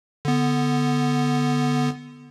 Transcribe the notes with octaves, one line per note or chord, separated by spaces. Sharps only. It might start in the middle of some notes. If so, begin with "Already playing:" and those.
D3 B3